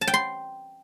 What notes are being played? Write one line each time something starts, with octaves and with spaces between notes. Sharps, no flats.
A5
G5
C6